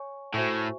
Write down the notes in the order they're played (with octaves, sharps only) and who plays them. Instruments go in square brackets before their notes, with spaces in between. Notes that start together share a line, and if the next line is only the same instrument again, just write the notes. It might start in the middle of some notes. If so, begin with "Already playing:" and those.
Already playing: [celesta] C#5 G#5 C#6
[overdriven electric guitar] A2 [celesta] F#4 C5 E5 G#5 C#6